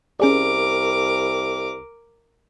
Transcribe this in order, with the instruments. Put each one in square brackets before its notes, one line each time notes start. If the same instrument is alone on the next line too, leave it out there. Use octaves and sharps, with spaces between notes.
[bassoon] C2 [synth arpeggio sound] C#4 G#4 D5 [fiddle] A#4 D6